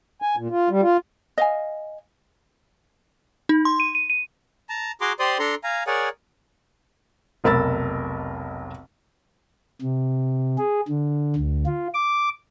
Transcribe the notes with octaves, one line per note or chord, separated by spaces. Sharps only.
G#5
A#2
F4
G3
F4
D#5 F5 G#5
D#4
C6
D#7
D#7
D#7
A5 A#5
F#4 G#4 A#5 C6 D6
G4 C5 D5 C6 D#6
D4 A4 A#5 C6
F5 G#5 A#5
G#4 A#4 C#5 D5 F#5 G#5
F1 B1 A#4 B5 E6 A6
C3
G#4
D3
D2
F4
D6